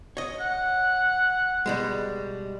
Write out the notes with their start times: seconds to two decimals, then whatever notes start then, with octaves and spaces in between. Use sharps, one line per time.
0.17 C#5 D#5
0.40 F#5
1.66 B2 G3 G#3